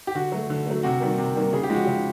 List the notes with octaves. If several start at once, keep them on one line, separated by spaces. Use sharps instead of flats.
G4
D3 F#4
F#3 A3
D3
F#3 A3
C3 F#4
D#3 G3 A#3
C3
D#3 G3 A#3
C#3 G#4
G4
F3 G#3 F#4
C#3 G4